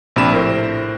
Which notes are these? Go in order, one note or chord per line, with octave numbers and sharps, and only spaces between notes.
A#1 C3 D4 B5 E7
A2 A#4 C5